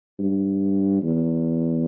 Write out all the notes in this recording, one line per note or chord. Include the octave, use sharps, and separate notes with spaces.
G2
E2